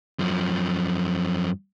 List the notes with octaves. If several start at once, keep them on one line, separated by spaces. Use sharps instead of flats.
F#2 F3